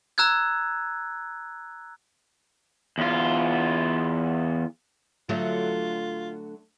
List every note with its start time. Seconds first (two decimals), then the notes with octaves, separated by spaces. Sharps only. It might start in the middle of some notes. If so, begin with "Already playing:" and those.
0.18 A#5 E6 F#6 G#6
2.98 E2 F4
5.29 D3 F#3 A3 F4